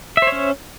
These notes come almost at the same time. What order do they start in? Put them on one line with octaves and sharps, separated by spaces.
E5 C5 C#5 C#4